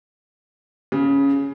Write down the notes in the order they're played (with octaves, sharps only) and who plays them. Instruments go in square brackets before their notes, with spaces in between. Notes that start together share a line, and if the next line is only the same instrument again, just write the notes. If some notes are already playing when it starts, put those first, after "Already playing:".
[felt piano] C#3